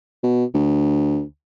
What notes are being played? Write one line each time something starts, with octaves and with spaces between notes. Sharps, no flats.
B2
D2